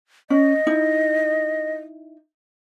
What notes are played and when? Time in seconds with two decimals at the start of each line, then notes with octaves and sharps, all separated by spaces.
0.30 C#4 D#5
0.67 D#4 E4